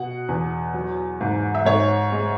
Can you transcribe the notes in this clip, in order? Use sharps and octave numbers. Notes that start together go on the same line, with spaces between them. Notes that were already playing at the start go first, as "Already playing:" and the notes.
Already playing: B2 F#5
E2
F#3
G#2
E5
G#2 C#5
G#3